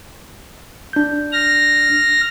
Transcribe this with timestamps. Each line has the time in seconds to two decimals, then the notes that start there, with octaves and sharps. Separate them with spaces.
0.93 D4 G6
1.32 F6 A#6